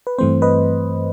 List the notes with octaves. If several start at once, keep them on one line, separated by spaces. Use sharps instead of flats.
B4
G2 E3 A3 C4 C5
B4 D#5